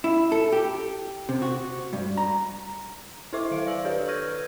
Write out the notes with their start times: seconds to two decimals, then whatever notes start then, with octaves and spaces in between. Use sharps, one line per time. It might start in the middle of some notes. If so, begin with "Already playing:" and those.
0.04 E4
0.32 A4
0.52 G4
1.29 C3
1.42 F#4
1.93 G2
2.17 A#5
3.33 E4 A4 C5 E5 C#6 D6
3.51 D#3 F5 D7
3.66 D5 F5 E6 F#7
3.84 D4 G4 A4 B4 C#5
4.08 C#6 F6 G6 G#6 A#6 D#7